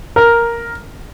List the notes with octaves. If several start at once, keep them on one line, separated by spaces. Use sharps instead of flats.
A#4